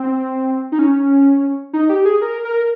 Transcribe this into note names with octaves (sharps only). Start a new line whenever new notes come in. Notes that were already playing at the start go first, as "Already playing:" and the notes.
Already playing: C4
D#4
C#4
D#4
G4
G#4
A#4
A#4